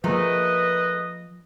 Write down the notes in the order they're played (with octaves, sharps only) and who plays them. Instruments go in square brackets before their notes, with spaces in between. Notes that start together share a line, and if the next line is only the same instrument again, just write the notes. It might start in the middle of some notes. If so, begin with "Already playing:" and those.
[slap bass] F3 A#3 [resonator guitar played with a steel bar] A3 G#4 A#4 [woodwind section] B4 D#5